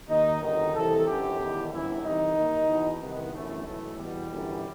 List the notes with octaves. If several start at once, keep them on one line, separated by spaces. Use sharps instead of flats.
D#2 D#3 D#4
G1 F#2 D#3 D#4
C2 C3 E3 A4
G1 F#2 E3 G4
E2 D#3
G1 F#2 E3 E4
C2 C3 E3 D#4
D#2 D#3
E2 B2
C2 C3 D#3 B3
G1 F#2 E3 A3
B1 A2 E3 A3
E2 B2 G3
G1 F#2 E3